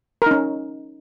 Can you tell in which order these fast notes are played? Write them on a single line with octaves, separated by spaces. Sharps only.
A#4 D#4 C#4